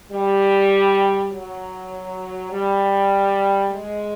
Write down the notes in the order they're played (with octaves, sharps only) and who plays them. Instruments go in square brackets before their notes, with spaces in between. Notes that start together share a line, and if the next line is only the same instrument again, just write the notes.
[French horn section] G3
F#3
G3
G#3